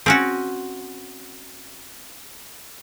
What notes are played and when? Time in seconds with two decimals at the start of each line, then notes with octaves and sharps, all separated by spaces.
0.06 C4 C#4 F#4